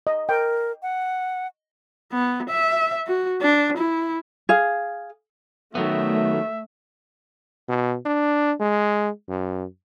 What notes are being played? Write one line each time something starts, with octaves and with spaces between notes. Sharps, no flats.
D#5
A#4 G5
F#5
B3
E5
F#4
D4
E4
G#4 F5
D#3 F#3 A3 B3 E5
B2
D4
G#3
F#2